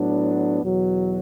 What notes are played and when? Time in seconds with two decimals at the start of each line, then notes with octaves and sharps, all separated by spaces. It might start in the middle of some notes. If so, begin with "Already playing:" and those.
Already playing: A2 F#3 B3 D4
0.63 E2 B2 F#3